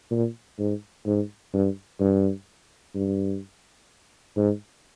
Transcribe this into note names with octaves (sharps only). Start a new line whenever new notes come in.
A#2
G#2
G#2
G2
G2
G2
G#2